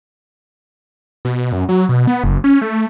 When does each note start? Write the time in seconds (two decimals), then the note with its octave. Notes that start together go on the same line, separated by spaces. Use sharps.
1.25 B2
1.52 F#2
1.69 F#3
1.89 B2
2.07 B3
2.24 F#1
2.44 C#4
2.62 A3